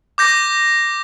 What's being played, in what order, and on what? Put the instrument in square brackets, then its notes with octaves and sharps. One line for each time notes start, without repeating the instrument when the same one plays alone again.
[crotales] D6 G6 A#6